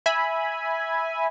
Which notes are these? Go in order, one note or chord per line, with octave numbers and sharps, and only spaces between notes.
E5 G#5 B5